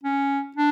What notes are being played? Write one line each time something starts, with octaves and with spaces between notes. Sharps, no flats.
C#4
D4